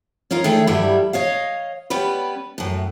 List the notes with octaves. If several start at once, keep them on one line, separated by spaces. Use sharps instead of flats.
C#4 D#4 F4 A#4
D#3 A3 D4 G#4
G2 F#3 G3 E4 E5
C#5 D#5 F5
G3 B3 C#4 B4
F#2 A2